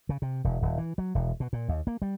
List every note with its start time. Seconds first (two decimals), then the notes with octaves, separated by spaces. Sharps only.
0.09 C#3
0.22 C3
0.44 E1
0.62 D#1
0.78 E3
0.98 F#3
1.15 E1
1.40 B2
1.53 A#2
1.69 D#2
1.87 A#3
2.02 G3